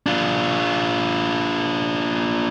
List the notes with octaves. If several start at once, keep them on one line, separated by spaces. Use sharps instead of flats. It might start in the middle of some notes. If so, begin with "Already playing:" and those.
D4 F4